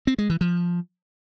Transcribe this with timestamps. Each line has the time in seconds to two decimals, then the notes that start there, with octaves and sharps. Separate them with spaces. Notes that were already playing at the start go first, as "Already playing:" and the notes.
0.07 C4
0.18 G#3
0.30 E3
0.41 F3